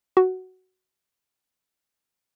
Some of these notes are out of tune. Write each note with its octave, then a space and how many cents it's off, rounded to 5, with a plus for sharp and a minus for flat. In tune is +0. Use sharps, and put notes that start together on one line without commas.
F#4 +10